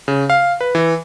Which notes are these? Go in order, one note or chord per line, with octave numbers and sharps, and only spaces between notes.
C#3
F5
B4
E3